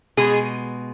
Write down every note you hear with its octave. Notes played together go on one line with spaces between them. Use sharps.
B2 G#3 G#4